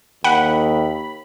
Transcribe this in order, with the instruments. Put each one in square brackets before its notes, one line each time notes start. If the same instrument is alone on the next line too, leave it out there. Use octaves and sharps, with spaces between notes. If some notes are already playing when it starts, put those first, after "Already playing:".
[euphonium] D#2 [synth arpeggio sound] F#5 [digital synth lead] B5